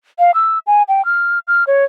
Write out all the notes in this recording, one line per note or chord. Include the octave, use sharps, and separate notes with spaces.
F5
E6
G#5
G5
F6
F6
C#5